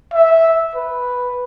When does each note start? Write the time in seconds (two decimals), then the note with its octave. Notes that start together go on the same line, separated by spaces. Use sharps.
0.13 E5
0.76 B4